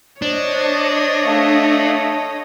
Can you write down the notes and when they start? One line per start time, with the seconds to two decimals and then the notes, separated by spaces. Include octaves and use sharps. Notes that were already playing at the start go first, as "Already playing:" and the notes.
0.22 D4 C5 C#5 D#5
1.24 A3 F5